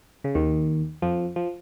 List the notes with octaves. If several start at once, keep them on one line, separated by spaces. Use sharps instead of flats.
C#3
D#2 D#3
F2 F3
F3